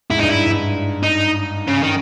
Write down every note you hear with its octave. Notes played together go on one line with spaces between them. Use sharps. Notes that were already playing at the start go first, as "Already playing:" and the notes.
G#2 E4
G2 D#4
E4
G2
D#4
C#3
D#3